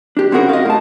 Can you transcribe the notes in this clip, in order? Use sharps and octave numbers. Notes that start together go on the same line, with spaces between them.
D4 G4
C4 C#4 E4 F#4 G#4 A#4
D#5 F5
A2 A5